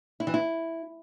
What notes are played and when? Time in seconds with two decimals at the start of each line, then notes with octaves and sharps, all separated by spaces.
0.20 E4
0.27 E3
0.34 E4